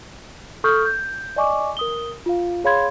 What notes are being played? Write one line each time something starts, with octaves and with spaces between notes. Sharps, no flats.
A4 C#6 D#6 F6 G6
G6
D5 D#5 G#5 C#6 D6
A#4 D#6 G7
F4 F5
G#4 C#5 F5 B5 C6 G#6